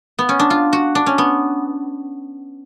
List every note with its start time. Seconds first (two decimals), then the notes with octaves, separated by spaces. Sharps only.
0.19 B3
0.29 C#4
0.39 D4
0.50 F4
0.73 F#4
0.95 D4
1.06 C#4
1.18 B3